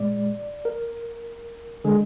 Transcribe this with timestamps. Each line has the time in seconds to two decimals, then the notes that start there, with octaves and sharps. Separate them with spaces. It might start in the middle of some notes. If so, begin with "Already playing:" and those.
Already playing: A#2 G#3 D5
0.65 A#4
1.84 D3 G#3 G#4